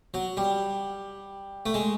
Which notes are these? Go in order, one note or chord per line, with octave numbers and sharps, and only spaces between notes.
F#3
G3
A3
G#3